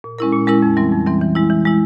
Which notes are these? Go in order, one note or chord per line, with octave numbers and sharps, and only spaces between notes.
A#2
G#3 C#4 E4 A#4
A#2
G#3 C#4 E4 A#4
F2
E3 G3 C4
F2
E3 G3 C4
E3
G#3 E4
E3
G#3 E4